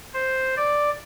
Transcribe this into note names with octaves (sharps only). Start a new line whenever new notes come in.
C5
D5